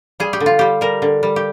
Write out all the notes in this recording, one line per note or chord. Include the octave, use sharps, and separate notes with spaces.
G3 G#4
G4
D3
F4
G3 G4
G3 A#4
D3
G3
G4